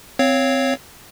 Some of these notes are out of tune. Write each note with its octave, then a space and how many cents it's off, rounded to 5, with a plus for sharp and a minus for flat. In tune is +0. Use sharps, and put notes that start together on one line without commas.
C4 -10 C#5 +0 F5 +0